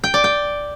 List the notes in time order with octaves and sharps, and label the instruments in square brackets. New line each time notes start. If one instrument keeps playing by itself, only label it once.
[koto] G5
D5
G5